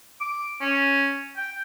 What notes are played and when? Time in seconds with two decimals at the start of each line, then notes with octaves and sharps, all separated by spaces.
0.21 D6
0.61 C#4
1.37 G5